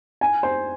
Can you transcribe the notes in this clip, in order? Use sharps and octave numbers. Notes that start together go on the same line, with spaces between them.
G#5
C5